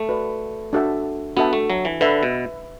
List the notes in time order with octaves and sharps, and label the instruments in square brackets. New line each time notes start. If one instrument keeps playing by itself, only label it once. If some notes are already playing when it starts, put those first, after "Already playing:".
Already playing: [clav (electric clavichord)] A3
[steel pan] F#4 B4 D5
D4 F#4 A4 E5 A5
[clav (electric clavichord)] B3 [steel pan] D4 F#4 A4 E5 A5
[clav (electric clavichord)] A3
F#3
E3
[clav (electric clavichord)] D3 [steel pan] B4 E5 B5
[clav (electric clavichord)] B2